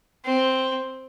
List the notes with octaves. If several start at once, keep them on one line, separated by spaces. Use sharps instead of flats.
C4